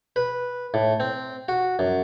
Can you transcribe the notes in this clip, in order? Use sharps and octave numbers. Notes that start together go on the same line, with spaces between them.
B4
A2
C4
F#4
F#2